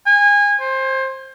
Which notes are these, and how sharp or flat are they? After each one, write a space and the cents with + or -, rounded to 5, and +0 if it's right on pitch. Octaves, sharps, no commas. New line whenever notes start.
G#5 -25
C5 +20